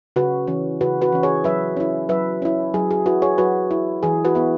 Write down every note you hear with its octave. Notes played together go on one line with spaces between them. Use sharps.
C#3 F#4 B4
E3 C#4
C#3 F#4 B4
F#4 B4
E3 C#4
G#4 C#5
F#3 B4 E5
C#4 E4
F#3 B4 E5
C#4 E4
F#3 G#4
G#4
E4 F#4 B4
G#4 C#5
F#3 F#4 B4
E4
E3 G#4
F#4 B4
B3 E4